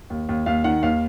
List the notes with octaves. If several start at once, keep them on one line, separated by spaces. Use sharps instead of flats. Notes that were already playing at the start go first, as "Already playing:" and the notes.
D#2
D#2
D#2 F5
D#3 F#5
D#2 F5